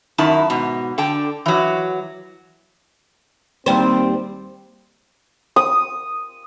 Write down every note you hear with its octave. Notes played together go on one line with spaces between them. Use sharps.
F#2 D#3 E4 A5
G#2 B2
D3 G5 A5
E3 F#3
D#2 G3 C4 C5
D#6